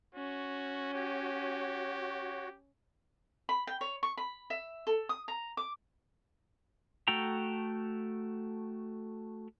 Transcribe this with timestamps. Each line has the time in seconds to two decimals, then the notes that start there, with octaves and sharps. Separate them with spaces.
0.15 C#4 F#4
0.94 F#4 G4 C#5
3.49 B5
3.67 G5
3.81 C#5
4.03 C#6
4.17 B5
4.50 E5
4.87 A4
5.09 D#6
5.28 A#5
5.57 D6
7.08 A3 F#4 A4 G5 A#5